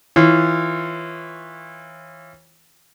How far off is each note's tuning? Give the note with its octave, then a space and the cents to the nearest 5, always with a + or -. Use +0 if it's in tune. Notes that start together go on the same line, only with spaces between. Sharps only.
E3 -20 F4 -20 C#5 -30